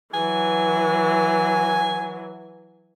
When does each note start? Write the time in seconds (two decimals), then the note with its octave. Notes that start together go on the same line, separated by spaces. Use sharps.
0.14 E3 F#3 G#5